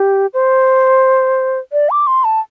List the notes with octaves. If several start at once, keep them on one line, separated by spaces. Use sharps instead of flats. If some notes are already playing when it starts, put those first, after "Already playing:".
Already playing: G4
C5
D5
D6
C6
A5